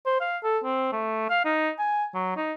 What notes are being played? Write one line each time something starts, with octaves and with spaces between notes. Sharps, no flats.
C5
F5
A4
C4
A3
F5
D#4
G#5
F#3
D#4